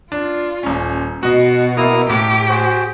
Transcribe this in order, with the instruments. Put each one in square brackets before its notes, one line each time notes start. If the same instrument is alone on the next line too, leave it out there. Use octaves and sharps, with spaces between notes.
[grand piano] D4 [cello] F4
[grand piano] D#1 C#4
[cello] B2 [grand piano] F#4 D#5
[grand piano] A#3 [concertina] E4 A#5 D#6
[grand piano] A2 [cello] G4 [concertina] D6
[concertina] F#4 G#4 C5